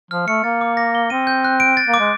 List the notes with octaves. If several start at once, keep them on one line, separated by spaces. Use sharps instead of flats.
F3 F6
A3 C#7
A#3 A6
D6
A#6
G7
C4 D#7
G6
F#6
D7
A6
A#3
D6
G#3